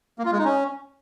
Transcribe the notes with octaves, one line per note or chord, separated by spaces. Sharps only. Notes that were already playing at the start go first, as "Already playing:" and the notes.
A#3
F4
G#3
D#4
C#4